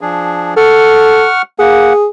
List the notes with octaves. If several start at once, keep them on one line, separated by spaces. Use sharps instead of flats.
F3 D4 G#4
A4 F#5 C#6 F6
A#3 G#4 F#5